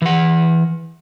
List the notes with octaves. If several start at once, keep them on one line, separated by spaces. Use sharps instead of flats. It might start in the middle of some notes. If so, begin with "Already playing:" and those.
E3 F#5